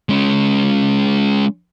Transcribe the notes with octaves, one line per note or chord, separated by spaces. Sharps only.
G#3 C#4